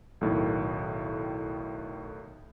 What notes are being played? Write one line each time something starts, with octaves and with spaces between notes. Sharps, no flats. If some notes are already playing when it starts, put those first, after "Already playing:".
B1 A2 D#3